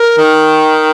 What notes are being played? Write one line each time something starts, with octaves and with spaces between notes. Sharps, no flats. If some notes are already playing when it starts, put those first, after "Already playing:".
Already playing: A#4
D#3